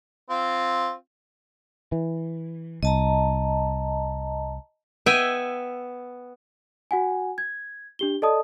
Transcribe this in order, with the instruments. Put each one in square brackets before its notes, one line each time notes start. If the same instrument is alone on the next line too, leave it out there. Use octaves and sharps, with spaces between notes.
[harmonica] C4 F4
[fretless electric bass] E3
[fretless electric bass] C2 [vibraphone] D#5 A5 A#5
[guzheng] B3 E5 G5 G#5
[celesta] F#4 F#5 G#5
G#6
D4 G4 G7
A4 D5 D#5 A5 D#6